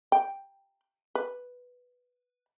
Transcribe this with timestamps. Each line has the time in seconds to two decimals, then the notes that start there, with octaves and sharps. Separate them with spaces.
0.12 G5
1.15 B4